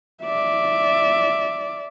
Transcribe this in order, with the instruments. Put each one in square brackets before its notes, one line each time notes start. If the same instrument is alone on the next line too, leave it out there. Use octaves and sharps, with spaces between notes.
[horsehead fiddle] D5 E5